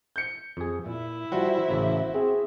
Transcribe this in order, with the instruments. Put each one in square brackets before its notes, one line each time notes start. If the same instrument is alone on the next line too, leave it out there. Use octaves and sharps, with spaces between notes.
[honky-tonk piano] G6 C#7
[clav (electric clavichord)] F2 G#4
[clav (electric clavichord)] A#2 [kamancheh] E4 E5
[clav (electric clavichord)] F3 G3 [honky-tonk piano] F#4 [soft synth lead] C5
[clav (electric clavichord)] A1 C#3 A#3
[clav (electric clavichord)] C4 [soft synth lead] G#4